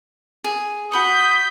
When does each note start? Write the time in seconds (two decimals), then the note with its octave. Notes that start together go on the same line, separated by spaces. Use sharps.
0.44 G#4
0.92 F#4 B5 C#6 D#6 G6 B6